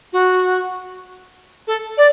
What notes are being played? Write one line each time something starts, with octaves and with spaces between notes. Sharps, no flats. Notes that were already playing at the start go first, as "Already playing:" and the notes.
F#4
A4
D5